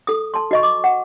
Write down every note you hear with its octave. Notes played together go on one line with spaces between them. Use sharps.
A4 D#6
A5 C6
F#4 D#5 C#6
D6
F#5